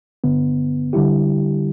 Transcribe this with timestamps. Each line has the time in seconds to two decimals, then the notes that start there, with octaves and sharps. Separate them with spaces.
0.24 G2 D3 B3
0.93 D3 G3 E4 G4